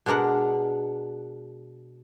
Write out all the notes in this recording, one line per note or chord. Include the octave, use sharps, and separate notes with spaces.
B2 G#3 D4 A#4 F#5